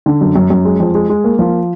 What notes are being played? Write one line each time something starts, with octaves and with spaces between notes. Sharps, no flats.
D3
F#2
F#2
F#2
G#3
F2
G#3
G#3
A#3
F3